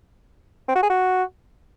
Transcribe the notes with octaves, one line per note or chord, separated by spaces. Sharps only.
C4
F#4
G#4
F#4